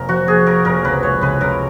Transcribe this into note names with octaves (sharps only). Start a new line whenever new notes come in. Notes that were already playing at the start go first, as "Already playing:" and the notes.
Already playing: F1 A#3 A#4
F3 F#4
A#3 G#4
A#3 A#4
F1 A#4
C#2 B4
G#3 C#5
C#2 B4
C#2 A#4